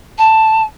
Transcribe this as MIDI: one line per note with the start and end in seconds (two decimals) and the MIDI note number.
0.18 0.63 81